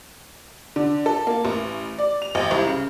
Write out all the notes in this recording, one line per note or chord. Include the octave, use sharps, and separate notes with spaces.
D3
A4
A#3
A1
D5
F7
G#1
C2
C#3